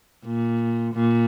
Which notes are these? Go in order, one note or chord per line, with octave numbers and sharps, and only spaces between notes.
A#2
A#2